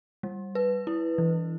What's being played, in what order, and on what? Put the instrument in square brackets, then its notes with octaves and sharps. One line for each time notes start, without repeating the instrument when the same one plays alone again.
[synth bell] G3
B4
E4
E3